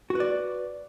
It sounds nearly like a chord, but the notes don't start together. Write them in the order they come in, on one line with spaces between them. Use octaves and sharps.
F#4 B4 D5